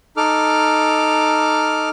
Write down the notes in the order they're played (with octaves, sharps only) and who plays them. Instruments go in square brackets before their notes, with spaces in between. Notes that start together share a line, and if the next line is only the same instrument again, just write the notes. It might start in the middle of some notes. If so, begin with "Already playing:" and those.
[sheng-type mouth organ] D#4 A4 D6 F6